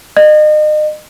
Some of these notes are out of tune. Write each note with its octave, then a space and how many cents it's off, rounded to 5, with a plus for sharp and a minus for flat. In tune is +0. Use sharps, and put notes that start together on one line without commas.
D#5 -35